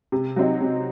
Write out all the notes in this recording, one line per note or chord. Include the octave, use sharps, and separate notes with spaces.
C3
F#3 C4 D#4
C3